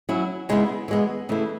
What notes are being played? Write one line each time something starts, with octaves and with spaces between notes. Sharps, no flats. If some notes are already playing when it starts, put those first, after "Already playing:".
F#3 C#4 E4
C#3 G#3 B3 E4
E3 G#3 B3
C#3 E3 A3 E4